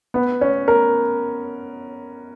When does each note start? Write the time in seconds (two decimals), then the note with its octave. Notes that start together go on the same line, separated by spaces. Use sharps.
0.14 B3
0.41 C#4
0.68 A#4